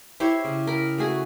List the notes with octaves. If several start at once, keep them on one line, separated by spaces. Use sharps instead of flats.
E4 G4 C5 C#5
C#3
A#4 B5
A3 F#4 G#4